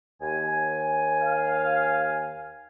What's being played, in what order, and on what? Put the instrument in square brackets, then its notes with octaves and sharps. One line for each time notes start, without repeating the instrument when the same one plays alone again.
[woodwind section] D#2 G#5
[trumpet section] F5